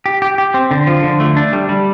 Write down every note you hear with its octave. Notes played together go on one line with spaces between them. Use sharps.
G4
G4
G4
C4
D3
F3
D3
A3
D4
G3
G3